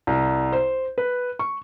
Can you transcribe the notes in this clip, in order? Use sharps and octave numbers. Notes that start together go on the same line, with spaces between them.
C2
C5
B4
C#6